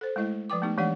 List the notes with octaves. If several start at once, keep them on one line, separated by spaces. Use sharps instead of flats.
A4 C5
G#3 A3 E4 D#5
F3 B4 G5 D6
A3 B3 D#4 G4
E3 G#3 D4 G4 D5 F#5